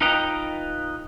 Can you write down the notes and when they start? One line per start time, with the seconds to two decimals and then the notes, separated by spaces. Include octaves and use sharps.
0.01 D#4 F4 B4 D#5 G5 A#5